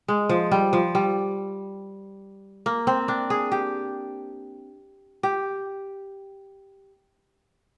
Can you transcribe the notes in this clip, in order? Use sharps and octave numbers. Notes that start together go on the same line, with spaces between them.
G#3
F3
G3
F3
G3
A#3
C4
D4
G#4
G4
G4